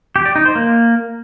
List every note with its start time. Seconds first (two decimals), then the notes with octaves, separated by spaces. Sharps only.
0.16 G4
0.26 D5
0.36 D#4
0.45 C5
0.55 A#3